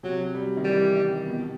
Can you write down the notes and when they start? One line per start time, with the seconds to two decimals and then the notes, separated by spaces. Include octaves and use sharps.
0.03 C3 F#3
0.35 G3
0.57 D#3
0.65 E3 G3
0.96 D#3
1.27 B2